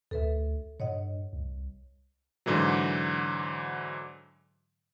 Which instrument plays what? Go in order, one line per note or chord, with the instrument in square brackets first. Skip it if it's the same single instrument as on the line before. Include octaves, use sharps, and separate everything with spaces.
[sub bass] D2 [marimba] A4 B4 E5
[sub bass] G2 [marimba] C#5 D#5 F#5
[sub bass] C2
[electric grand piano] G#2 D3 E3 F#3